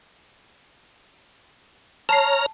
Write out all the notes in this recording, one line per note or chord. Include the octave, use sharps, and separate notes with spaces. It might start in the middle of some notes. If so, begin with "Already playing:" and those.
C#5 A5 A#5 F6 C7